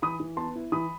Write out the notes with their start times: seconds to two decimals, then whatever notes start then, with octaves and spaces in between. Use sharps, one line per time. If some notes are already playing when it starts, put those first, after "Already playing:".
0.02 E3 B5 D#6
0.20 E3
0.37 B3 A5 C6
0.55 E4
0.72 E3 B5 D#6